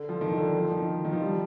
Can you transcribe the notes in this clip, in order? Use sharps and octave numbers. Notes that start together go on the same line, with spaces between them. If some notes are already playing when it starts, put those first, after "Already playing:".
Already playing: D3
F3
D#3
D3
F3
D#3
D#3
F3
G3